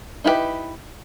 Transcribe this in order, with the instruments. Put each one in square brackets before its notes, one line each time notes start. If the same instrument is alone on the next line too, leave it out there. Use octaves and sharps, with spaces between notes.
[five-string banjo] D#4 E4 F#4 G4 B4